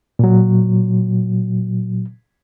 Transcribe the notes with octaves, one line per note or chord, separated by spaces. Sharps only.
A#2 F#3